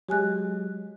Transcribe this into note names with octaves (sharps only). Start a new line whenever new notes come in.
F#3 G#3 G4 G#5 F#6